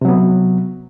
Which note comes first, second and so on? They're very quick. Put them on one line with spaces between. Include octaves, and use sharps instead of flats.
C3 F#3 B3